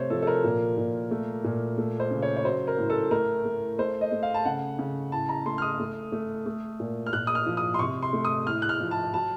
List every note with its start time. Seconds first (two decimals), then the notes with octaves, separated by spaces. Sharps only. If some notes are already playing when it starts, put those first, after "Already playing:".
Already playing: C3 A3 C5 C#5
0.10 F3 A4
0.22 A4
0.27 A#4
0.44 A#2
0.77 A#2
1.11 A3
1.44 A#2
1.78 A3
2.00 C5
2.11 C#3
2.22 C#5
2.37 C#5
2.45 F#3 C5
2.67 A#4
2.78 A2
2.90 A4
3.11 A3 A#4
3.45 A3
3.78 A3 C5
4.01 D#5
4.12 A3
4.23 F5
4.34 A5
4.45 C#3 F#5
4.79 C#3
5.12 A2 A5
5.29 A#5
5.46 A3 C6
5.58 F6
5.62 D#6
5.80 A3
6.12 A3
6.46 A3
6.80 A#2
7.06 F6
7.13 A#2 F#6
7.27 D#6
7.35 F6
7.46 F3
7.57 D#6
7.74 C6
7.79 C3 C#6
8.03 C6
8.13 A3
8.25 D#6
8.47 A2 F6
8.62 F#6
8.69 F6
8.80 F3
8.91 A5
9.14 F#3 A5